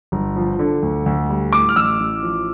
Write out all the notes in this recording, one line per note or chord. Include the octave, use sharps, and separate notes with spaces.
G1
F3
D3
D2
D2
G3
A2 D6
F6
A1 E6
A1
F3